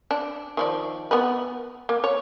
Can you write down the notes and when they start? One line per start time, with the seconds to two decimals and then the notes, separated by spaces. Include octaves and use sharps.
0.11 D4
0.57 D#3 F3 D5
1.11 B3 A#4 B4
1.89 A#3
2.04 C#5